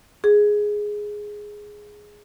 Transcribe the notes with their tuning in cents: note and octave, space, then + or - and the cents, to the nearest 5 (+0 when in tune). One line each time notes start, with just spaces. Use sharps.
G#4 +0